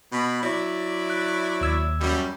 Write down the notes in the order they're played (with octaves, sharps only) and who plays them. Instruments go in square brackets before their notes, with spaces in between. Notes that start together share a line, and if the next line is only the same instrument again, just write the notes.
[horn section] B2 B5
F#3 E4 D5
[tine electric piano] F#6
D#2 E6 G#6
[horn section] F#2 G3